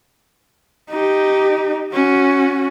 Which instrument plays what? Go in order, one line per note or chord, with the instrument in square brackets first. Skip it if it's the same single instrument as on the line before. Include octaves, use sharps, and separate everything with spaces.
[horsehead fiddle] D#4 G4
C#4 F#4